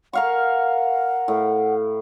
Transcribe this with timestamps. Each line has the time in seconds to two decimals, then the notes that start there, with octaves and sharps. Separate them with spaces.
0.13 A#4 F5 F#5 C#6
1.28 A2